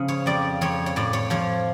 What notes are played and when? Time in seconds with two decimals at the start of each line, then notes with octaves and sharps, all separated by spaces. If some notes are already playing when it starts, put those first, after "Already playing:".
Already playing: C#3 F3
0.08 C#5
0.26 F2 D5
0.61 F2 C#5
0.86 C#5
0.96 A2 D5
1.13 C#5
1.30 F3 C#5